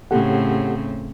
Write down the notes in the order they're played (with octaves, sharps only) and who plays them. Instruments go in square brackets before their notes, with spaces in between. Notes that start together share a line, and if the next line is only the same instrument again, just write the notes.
[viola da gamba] A2 C#3 C4 [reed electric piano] G4 A4 F#5